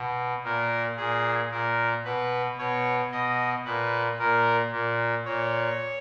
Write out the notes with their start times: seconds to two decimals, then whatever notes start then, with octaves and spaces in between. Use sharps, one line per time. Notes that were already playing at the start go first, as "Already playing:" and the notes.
Already playing: B2
0.43 A#2 A#4
0.97 A#2 G#4
1.50 A#2 A#4
2.05 B2 B4
2.58 B2 C#5
3.11 B2 D#5
3.65 A#2 B4
4.18 A#2 A#4
4.71 A#2
5.25 A#2 C#5